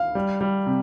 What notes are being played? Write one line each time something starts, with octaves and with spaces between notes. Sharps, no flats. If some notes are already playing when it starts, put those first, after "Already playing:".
Already playing: F5
G3
G3
C3